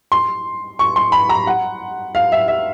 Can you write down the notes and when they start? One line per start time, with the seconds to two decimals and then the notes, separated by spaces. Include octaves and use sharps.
0.12 C6
0.79 C#6
0.96 C6
1.12 B5
1.29 A#5
1.47 F#5
2.15 F5
2.32 E5
2.48 E5